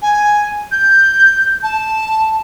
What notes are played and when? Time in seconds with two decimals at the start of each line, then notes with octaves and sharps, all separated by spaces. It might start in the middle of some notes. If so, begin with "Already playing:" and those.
0.02 G#5
0.71 G6
1.63 A5